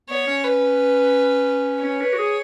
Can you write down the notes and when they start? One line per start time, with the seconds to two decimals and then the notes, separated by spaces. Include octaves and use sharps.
0.09 B3 C#5
0.27 C#4
0.45 B4
1.84 C#4 C#5
2.01 B4
2.13 F#4
2.19 G#4